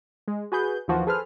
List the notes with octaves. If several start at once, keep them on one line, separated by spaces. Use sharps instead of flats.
G#3
F#4 G#4 B4 G6
D#2 E3 F3 F#4 C5
G#4 A4 B4 C5 F6